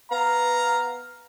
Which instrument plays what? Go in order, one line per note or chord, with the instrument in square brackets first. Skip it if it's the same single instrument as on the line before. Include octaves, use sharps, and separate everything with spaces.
[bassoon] B3 [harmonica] F5 A#5